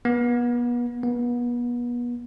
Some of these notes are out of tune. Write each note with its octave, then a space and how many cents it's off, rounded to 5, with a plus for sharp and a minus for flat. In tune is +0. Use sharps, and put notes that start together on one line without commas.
B3 -35
B3 -35